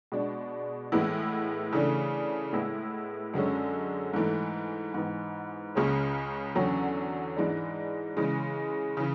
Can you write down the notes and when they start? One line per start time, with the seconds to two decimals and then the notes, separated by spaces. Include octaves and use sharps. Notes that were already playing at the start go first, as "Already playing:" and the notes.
0.12 B2 G#3 D4
0.92 A2 E3 G#3 B3 E4
1.73 C#3 E3 A3 D4
2.53 A2 G#3 B3 E4
3.34 F#2 D3 G#3 C#4
4.14 G#2 E3 A3
4.94 G#2 E3 B3
5.75 C#2 C#3 G#3 C#4
6.55 E2 D3 F#3 C#4
7.37 G#2 E3 G#3 D4
8.17 C#3 E3 G#3
8.97 C#3 E3